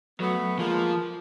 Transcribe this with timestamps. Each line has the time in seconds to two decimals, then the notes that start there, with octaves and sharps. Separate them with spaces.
0.20 F#3 A3 B3
0.59 F3 G#3 A#3